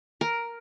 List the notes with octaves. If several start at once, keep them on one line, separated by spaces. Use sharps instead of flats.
A#4